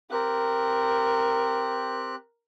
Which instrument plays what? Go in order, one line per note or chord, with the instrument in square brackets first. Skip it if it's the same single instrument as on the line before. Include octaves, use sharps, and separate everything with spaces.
[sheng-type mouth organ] C4 G4 F#6 [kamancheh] A#4